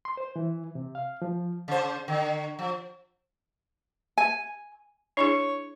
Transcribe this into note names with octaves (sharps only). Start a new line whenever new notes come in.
C6
C5
E3
C3
F5
F3
C#3 C5
D3
F3
G#5
D4 E4 G#4 C#5